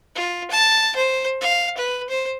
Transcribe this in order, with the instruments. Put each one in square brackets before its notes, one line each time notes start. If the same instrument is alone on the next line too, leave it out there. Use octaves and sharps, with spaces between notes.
[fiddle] F4
A5
C5
F5
B4
C5